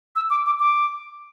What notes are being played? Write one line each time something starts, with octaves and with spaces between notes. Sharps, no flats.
E6
D6
D6
D6